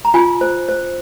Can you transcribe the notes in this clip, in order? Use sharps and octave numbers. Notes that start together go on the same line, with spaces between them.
A#5
F4 G#5
C5
C5